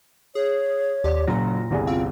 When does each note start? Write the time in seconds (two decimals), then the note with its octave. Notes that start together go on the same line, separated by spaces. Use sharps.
0.35 G#4 C#5
1.04 D#2 G4 D5
1.27 F#1 F#2 A#2 A#5 A#6
1.71 G1 C2 G#4 D5
1.87 C4 F4 F5